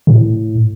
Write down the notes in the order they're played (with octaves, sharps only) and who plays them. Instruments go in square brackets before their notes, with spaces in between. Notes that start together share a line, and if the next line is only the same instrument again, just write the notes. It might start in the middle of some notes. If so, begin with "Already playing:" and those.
[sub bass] A2